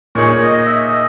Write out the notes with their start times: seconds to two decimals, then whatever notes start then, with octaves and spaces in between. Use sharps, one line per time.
0.15 A#2 A#3 D#4 G#4 C#5
0.41 D#5
0.66 E5
0.92 D#5